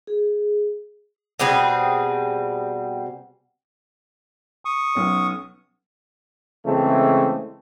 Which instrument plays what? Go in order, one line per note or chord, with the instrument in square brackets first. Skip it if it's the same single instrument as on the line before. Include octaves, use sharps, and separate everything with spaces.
[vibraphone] G#4
[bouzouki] B2 G3 C4 G#4
[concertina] C#6 D#6
[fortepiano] B1 C#4
[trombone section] C#3 E3 G#3 A3 C4